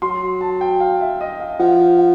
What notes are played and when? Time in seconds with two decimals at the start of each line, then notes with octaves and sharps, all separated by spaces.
0.02 F#3 C6
0.41 A5
0.61 G5
0.80 F5
1.01 E5
1.21 D#5
1.40 F5
1.59 F3 F#5
1.98 F#5